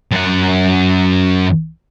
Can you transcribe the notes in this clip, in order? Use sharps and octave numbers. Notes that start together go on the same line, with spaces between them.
F#2 F#5